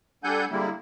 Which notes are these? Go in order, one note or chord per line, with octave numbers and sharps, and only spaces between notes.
G3 D4 A4 F#5 G#5 G6
D3 G3 G#3 A#3 E4